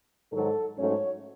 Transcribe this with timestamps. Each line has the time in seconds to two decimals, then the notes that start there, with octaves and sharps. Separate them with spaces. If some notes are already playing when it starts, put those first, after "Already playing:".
0.32 G#2 D#3 F#3 A4
0.77 G#2 F#3 A3 C#4 C#5